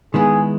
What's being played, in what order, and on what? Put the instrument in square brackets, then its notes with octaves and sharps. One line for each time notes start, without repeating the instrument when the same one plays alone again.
[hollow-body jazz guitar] D#3 G#3 B3 E4 [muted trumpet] G#4